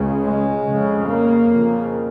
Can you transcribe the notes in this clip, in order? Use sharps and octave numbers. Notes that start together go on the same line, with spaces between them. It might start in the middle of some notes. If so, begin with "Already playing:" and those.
Already playing: C#2 C#3
G#3
F2 C#3
A#3
F2 C#3